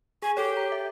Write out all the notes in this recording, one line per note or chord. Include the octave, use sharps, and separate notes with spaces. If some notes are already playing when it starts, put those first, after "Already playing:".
G#4 G#5
G4 A4 C#5
A#5
E5